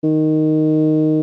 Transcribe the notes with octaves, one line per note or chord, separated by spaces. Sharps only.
D#3